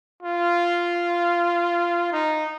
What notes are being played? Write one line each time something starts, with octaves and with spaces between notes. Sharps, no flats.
F4
D#4